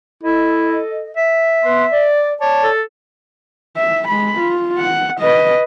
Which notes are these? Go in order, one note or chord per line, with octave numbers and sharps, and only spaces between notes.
E4 A4 D#5
E5
B3 B4 C6
D5
C#5 D5 A5
A4
E5
G#3 B5
F4
F#5
B4 D#5